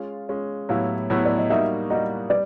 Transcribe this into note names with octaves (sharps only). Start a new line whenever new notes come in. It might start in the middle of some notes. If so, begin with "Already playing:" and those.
Already playing: G#3 C#4 F4
G#3 C#4 F4
A2 F#3 B3 E4 G4 F5
A2 F#3 B3 E4 G4
D5
D#5
G3 A#3 D#4 F#4 E5
G3 A#3 D#4 F#4 D#5
G3 D5